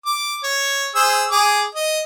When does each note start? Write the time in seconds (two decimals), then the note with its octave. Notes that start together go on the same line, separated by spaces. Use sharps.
0.06 D6
0.44 C#5
0.95 G#4 C5 E6
1.31 G#4 D6
1.75 D#5